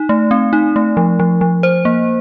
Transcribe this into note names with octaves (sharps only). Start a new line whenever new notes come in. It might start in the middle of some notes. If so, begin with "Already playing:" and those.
Already playing: D#4
A3
C4
D#4
A3
F3
F3
F3
C5
A#3